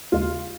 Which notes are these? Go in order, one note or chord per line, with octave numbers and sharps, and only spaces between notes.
D#2 C#3 G#3 F4